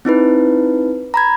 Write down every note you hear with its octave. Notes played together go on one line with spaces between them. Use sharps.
C4 D#4 E4 B4
A#5 B5 G#6